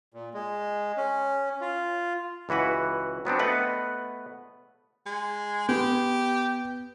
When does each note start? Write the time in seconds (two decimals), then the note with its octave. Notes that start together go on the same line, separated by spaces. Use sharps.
0.14 A#2
0.34 G#3
0.97 C#4
1.61 F4
2.49 C#2 E3 F#4 B4 F#5
3.25 F#3 B3 C4 D4
3.39 A3 B3 B4 D#5 F#5
5.06 G#3
5.69 B3 G4